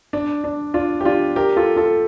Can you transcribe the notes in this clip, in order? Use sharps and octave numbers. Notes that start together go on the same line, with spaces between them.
D4
D4
D4 F4
G4
D4 F4
G4 A#4
F4 A4
F4 A4